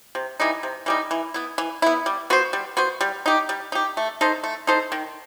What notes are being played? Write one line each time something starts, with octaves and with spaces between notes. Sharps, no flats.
C3
E3 G3 D#4
C3
E3 G3 D#4
E3
B3 E4
E3
B3 E4
G3
B3 F#4 C5
G3
B3 F#4 C5
G3
D#4 G4
G3
D#4 G4
A3
D#4 A4 C5
A3
D#4 A4 C5
D#3